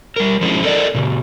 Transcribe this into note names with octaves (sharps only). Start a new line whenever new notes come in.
G3 A#4
F3 F#3 G#3 C#4 E4 G#4
A4 A#4 D5 D#5
A#2 C#3